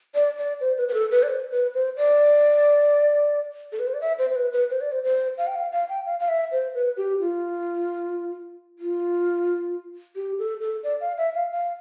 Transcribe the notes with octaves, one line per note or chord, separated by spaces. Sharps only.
D5
D5
C5
B4
B4
A4
B4
D5
C5
B4
C5
D5
A4
B4
C5
D5
E5
C5
C5
B4
B4
C5
D5
C5
C5
F5
G5
F5
F5
G5
F5
F5
E5
C5
B4
G4
F4
F4
G4
A4
A4
D5
F5
E5
F5
F5